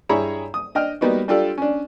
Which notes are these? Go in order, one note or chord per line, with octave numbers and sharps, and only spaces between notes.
G2 E4 G#4 C#5 A#5 B5
D#6
D4 D#5 G5 F6
G3 A#3 B3 D#4 F#4
G3 D4 F4 G4 A4 D5
C#4 D4